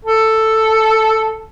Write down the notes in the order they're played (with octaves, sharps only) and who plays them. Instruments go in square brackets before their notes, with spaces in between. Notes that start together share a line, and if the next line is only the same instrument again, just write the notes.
[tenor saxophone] A4